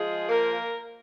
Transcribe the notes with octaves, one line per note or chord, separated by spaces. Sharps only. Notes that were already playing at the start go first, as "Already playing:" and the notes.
Already playing: F3 G#3 F4 G#4
A#3 A#4